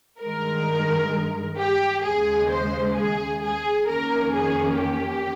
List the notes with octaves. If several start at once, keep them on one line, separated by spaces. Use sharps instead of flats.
G2 D#3 G#3 A#4
G4
D#2 C#3 G#3 G#4
C5
G#4
G#4
F2 D#3 A#3 C#4 A#4
G#4
G4